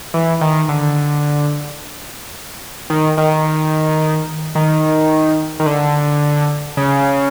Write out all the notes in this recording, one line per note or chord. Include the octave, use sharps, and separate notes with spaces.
E3
D#3
D3
D#3
D#3
D#3
D#3
D3
C#3